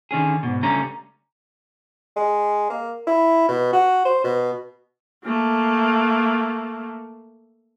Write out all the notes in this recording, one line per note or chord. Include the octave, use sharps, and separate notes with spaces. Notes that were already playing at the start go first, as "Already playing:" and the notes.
D3 D#3 C#4 G#4
G#2 B2
C#2 D3 G3 A3 C#4 A#5
G#3
A#3
E4
B2
F#4
C5
B2
A3 A#3